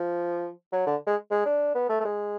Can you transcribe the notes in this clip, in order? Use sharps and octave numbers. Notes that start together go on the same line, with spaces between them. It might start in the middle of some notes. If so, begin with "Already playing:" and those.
Already playing: F3
F#3
D3
G#3
G#3
D4
B3
A3
A3
G#3